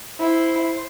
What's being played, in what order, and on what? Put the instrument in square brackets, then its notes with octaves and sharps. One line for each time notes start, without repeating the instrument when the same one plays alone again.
[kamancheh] E4 [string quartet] C5